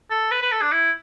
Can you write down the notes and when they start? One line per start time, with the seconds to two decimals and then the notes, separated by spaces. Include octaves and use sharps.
0.11 A4
0.31 B4
0.42 B4
0.52 A4
0.61 D4
0.72 E4